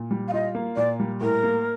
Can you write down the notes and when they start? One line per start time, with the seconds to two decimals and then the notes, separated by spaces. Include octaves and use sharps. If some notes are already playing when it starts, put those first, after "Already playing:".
Already playing: A#2
0.11 G3
0.28 F5
0.33 F4 D#5
0.55 A#3
0.76 A#2 D5
1.00 G3
1.21 A2 A#4
1.43 A#3